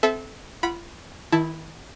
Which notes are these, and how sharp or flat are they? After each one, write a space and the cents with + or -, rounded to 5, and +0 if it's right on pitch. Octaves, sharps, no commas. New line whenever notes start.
C4 -20 A4 -25 E5 +0
F4 -35 F#5 +0 B5 -15
D#3 +40 E4 +0 A5 +0